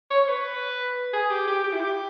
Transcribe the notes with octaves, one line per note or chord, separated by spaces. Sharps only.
C#5
C#5
B4
G#4
G4
G4
G4
E4
G4